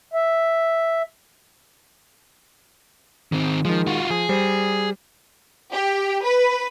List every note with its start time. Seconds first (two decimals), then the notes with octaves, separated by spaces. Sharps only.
0.13 E5
3.32 D#3 C4
3.65 D#3 F3 G#3
3.87 F4 F#4
4.10 F3 G#4
4.29 G3 C5
5.73 G4
6.24 B4